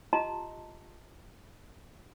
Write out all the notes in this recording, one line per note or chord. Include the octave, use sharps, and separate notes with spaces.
F4 G4 D#5 A5 A#5 C6